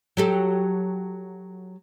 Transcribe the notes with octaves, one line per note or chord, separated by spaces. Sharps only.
F#3 G4 A4